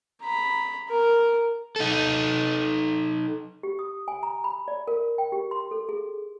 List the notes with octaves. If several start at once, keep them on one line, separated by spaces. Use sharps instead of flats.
A#5 B5
A#4
D#4 A4
G4
D#6
G#5
A#5
B5
D5
A#4
G5
G4
C6
A4
G#4